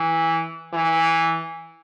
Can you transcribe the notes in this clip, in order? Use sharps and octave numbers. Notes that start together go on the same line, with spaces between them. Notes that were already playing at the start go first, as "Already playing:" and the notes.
Already playing: E3
E3